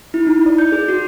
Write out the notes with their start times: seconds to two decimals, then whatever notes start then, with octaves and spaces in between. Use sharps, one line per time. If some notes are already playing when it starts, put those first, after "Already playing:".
0.14 E4
0.27 D#4
0.46 D5
0.58 G6
0.72 G#4
0.88 F#4